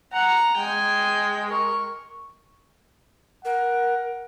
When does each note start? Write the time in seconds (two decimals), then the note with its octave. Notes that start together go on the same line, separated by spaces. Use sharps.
0.13 F#5 A#5
0.57 G#3 G5 G#5
1.50 A#4 C#6
3.45 A#4 F#5